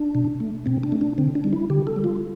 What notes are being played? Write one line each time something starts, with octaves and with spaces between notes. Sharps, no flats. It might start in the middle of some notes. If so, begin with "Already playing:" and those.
Already playing: D4
B2
A3
B2 C4
D4
A3
D4
D3 C4
D4
G3
E4
D3 G4
A4
G3
F4